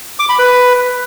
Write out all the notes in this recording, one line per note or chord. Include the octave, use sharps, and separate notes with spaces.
D6
B5
B4